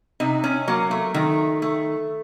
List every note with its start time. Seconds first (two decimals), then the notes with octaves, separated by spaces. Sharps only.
0.20 C3 D#4
0.44 C#4
0.68 F#3 A#3
0.91 A3
1.14 D#3 A3
1.62 A3